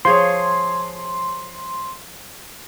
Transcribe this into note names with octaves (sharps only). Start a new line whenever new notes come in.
F3 G#4 C#5 C6